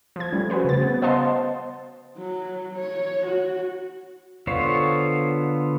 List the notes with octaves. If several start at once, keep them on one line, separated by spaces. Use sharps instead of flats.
F3 G#6
G3 A3 C#4
F#4 G#4 B4 C5
C#3 A6
B3
C5 D#5 F5 F#5 A5 C6
F#3
C#5
F#4
D3 B3 F4 C5 C#5